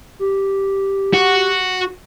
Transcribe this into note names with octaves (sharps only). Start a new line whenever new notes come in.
G4
F#4